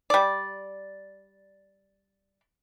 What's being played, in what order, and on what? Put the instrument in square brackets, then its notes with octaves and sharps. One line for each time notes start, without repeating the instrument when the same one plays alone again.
[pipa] G3 D5